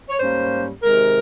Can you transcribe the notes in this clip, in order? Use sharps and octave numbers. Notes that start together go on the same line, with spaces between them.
C#5
G#2 G3 A#3 C#4 C5
C3 D#3 G#3 A#4